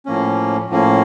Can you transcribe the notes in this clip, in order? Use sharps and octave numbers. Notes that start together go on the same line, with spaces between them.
A2 F3 A#3 C#4
A2 F3 A#3 C#4